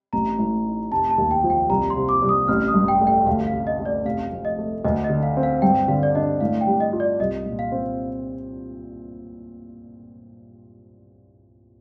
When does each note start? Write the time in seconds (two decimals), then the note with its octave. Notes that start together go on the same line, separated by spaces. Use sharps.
0.13 A1 A#5
0.39 A2
0.66 D#4
0.92 F1 A5
1.11 A5
1.18 D#2
1.31 G5
1.44 F3
1.50 G5
1.70 C2 A#5
1.90 C6
1.96 C3
2.09 D6
2.22 C2
2.29 D#6
2.48 A1 F6
2.68 D#6
2.74 G2
2.88 G5
3.01 A3
3.07 G5
3.26 D2 F5
3.47 F5
3.53 C3
3.67 D#5
3.79 A3
3.86 D5
4.05 F1 F5
4.32 F2
4.45 D#5
4.58 A3
4.85 D2 D#5
5.04 D#5
5.10 D3
5.23 F5
5.37 C4
5.43 F5
5.62 G2 G5
5.88 D3 F5
6.03 D5
6.15 D4 D#5
6.41 A2 F5
6.61 G5
6.67 G3
6.80 D#5
6.93 F4
7.00 D5
7.20 C2 D#5
7.46 A#2
7.59 F5
7.72 C4